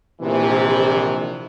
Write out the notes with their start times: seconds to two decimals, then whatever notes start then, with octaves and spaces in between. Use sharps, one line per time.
0.21 A#1 C3 D#3 E3